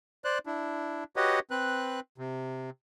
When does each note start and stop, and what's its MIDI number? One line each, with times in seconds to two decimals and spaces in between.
0.25 0.38 72
0.25 0.38 74
0.25 0.38 90
0.46 1.04 62
0.46 1.04 64
1.16 1.39 66
1.16 1.39 67
1.16 1.39 71
1.16 1.39 73
1.16 1.39 75
1.16 1.39 78
1.51 2.00 60
1.51 2.00 71
1.51 2.00 90
2.18 2.70 48